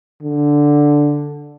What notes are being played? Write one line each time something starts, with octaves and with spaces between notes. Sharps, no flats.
D3